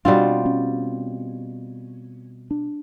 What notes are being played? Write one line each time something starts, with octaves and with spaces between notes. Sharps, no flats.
B2 G3 C4 D4 F4
C#4
D4